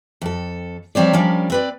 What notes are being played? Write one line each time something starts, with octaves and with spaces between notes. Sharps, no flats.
F2 A4
F3 G3 C4 C#5 D5
F3 G3 A#3 C#4 D4
C4 B4 D5